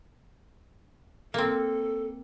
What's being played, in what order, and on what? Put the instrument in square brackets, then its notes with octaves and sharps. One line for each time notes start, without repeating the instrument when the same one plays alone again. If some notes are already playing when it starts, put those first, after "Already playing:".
[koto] A#3 C4 [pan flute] A4